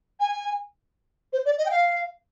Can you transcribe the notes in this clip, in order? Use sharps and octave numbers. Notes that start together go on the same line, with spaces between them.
G#5
C5
D5
D#5
G5
F5